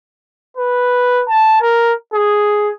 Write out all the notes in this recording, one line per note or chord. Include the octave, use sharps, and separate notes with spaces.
B4
A5
A#4
G#4